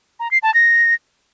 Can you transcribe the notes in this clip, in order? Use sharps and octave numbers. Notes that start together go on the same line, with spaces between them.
A#5
C7
A5
A#6